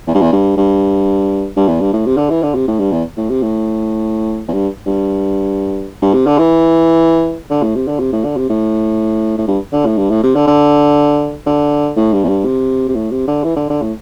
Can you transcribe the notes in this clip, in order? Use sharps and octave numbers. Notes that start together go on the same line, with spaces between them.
E2
G2
E2
G2
G2
G2
E2
G2
A2
C3
D3
E3
D3
C3
A2
G2
E2
A2
C3
A2
E2
G2
G2
G2
C3
D3
E3
D3
A2
C3
D3
C3
A2
D3
C3
A2
A2
G2
D3
A2
G2
A2
C3
D3
D3
D3
A2
G2
E2
G2
C3
C3
A2
C3
D3
E3
D3
D3
A2